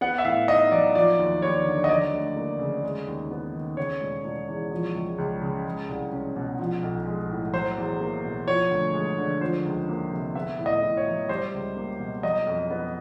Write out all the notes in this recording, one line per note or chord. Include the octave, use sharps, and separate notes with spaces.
B3 F#5
E5
A2 F5
D#4 D#5
F#3 D5
F3 D5
D#2
D#2 C#5
D3
D#5
F#3 D5
D2
A#3
C#3
G#3
D#2
B3
D#3
C#3 C#5
E1
E1
E2
F3
C#2
C#2
C#3
G#3
C2
C#4
B2
F3
B1
G#3
A2
F#3 C5
E2
A#3
B2
F3 C#5
D2
G#3
D3
F3 C5
C#2
A#3
C3
B3 E5
A2
D#5
A2
C#5
F#3
G3 C5
C#2
A#3
B2
F#3 D#5
F2
B3